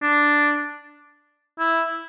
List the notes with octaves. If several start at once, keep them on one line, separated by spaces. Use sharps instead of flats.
D4
E4